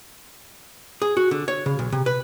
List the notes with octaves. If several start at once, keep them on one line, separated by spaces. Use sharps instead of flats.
G#4
F#4
D3
C#5
C#3
B1
C3
B4